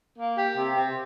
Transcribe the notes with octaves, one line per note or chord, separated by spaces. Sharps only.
A#3
G4
C3
C4